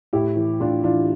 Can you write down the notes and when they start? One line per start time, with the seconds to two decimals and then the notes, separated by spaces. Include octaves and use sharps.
0.13 A2 E4 G4
0.36 E3
0.60 A2 D4 F4
0.84 E3 D4 F4